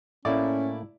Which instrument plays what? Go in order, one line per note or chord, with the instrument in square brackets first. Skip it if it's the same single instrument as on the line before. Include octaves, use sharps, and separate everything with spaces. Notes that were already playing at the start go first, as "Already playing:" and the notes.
[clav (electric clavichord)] A2 A3 A#3 [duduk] C#4 [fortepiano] E4 D5